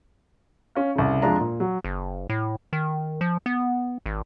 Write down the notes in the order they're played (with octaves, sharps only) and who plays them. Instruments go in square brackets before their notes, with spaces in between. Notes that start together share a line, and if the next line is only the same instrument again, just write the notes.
[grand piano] C#4 F5
C2 C#3
F2 G#3 D4 F4 A#5
A#2
F#3
[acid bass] F#1
A2
D#3
F3
B3
G#1